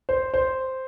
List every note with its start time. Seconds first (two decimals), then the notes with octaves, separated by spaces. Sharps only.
0.09 C5
0.34 C5